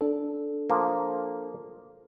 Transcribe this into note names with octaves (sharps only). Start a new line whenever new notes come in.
D4 A4
F3 A#3